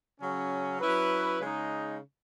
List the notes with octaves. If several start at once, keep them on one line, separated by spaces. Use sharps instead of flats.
C#3 F#3 C#4
F#3 C#4 E4 B4
C#3 G#3 D#4